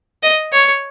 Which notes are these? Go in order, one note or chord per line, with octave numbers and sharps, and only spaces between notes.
D#5
C#5